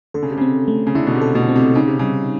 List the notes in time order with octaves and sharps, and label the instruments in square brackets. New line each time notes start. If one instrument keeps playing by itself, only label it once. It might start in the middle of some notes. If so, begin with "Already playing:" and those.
[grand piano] D3 [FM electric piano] A4
[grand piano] C#3
C3
[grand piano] C#3 [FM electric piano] C4
[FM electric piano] A3
[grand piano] C#3
[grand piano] D3 [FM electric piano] E4
[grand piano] B2
C3
[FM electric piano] A4
[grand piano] B2
[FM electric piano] C4
[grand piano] C3
[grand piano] C#3 [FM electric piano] D#4
[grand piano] C3
[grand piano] C#3 [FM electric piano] G3